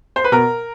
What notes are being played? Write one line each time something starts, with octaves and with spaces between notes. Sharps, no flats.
C5
B4
B2 A#4